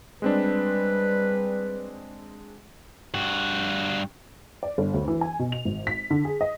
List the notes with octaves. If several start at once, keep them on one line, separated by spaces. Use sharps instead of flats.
G3 G#3 C4 D4 B4
G2 F#4
D5
G1
D2
E3
G#5
B2
F7
G#1
B6
D3
G#4
D#5